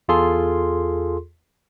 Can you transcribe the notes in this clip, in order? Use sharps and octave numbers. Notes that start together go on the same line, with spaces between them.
E2 F4 G#4 A4 C6